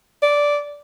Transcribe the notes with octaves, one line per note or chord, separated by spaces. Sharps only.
D5